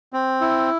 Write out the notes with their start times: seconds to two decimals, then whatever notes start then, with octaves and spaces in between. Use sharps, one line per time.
0.13 C4
0.41 E4